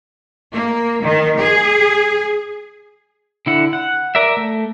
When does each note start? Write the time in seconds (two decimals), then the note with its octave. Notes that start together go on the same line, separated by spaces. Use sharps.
0.54 A#3
1.02 D#3
1.40 G#4
3.46 D3 E4 F#5
3.73 F#5
4.15 A#4 D5 E5
4.37 A3